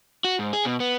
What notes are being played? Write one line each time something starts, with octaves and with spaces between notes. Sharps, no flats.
F#4
G#2
G#4
B2
B3